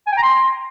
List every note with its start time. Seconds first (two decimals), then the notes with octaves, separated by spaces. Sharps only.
0.07 G#5
0.12 G5
0.17 A#5
0.23 C6